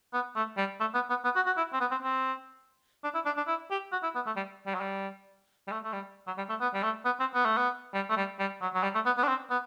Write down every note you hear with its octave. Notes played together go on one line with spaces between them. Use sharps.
B3
A3
G3
A3
B3
B3
B3
F#4
F#4
E4
C4
B3
C4
C4
D4
E4
D4
D4
E4
G4
F#4
E4
B3
A3
G3
G3
F#3
G3
G3
A3
A3
G3
F#3
G3
A3
B3
G3
A3
B3
C4
B3
A3
B3
G3
A3
G3
G3
F#3
F#3
G3
A3
B3
B3
D4
C4
B3